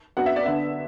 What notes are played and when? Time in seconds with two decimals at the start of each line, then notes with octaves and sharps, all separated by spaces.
0.17 F#2 F#3 B3 D4 F#5
0.26 E5
0.36 D5
0.46 D3 B3 D4 E5